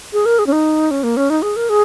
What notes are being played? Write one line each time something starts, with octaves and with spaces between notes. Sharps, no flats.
G#4
A#4
G#4
C#4
D#4
C#4
A#3
C#4
D#4
G#4
A#4
G#4